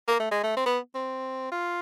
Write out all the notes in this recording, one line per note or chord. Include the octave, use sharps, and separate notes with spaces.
A#3
A3
G#3
A3
C4
B3
C4
F4